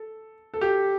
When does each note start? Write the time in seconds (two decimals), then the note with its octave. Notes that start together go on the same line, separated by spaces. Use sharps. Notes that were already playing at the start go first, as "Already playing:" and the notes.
Already playing: A4
0.54 A4
0.61 G4